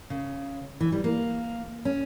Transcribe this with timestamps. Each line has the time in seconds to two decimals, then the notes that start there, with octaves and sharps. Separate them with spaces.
0.10 C#3
0.81 E3
0.92 G3
1.04 A#3
1.85 C#4